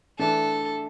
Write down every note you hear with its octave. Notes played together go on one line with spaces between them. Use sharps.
E3 A3 D4 A4